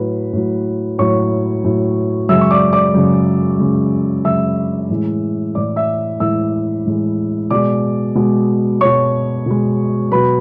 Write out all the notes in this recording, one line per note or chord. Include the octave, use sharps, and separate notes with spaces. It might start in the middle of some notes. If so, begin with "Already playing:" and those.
Already playing: A2 F#3 B4
A2 F#3
A2 F#3 C#5 C#6
A2 F#3
F#2 C#3 G#3 E5 E6
C#6
D5 D6
D5 D6
F#2 C#3 G#3
F#2 C#3 G#3
F#2 C#3 G#3 E5 E6
A2 E3 G#3
A2 E3 G#3 D5 D6
E5 E6
A2 E3 G#3 E5 E6
A2 E3 G#3
B2 G#3 D5 D6
B2 G#3
B2 G#3 C#5 C#6
B2 G#3
B2 F#3 B4 B5